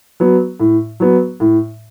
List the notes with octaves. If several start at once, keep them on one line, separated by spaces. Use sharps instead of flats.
F#3 B3
A2
F#3 B3
A2